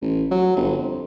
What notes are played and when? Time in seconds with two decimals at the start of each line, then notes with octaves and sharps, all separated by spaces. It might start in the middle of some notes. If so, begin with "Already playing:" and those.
0.02 A1
0.31 F#3
0.56 G1
0.78 F2